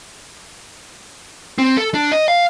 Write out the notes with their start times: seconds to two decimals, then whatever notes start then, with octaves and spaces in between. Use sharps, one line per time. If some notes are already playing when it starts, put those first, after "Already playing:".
1.58 C4
1.77 A4
1.94 D4
2.12 D#5
2.28 F5